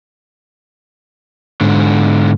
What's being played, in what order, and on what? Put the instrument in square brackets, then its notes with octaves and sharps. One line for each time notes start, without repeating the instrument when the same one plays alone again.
[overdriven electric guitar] G#2 D3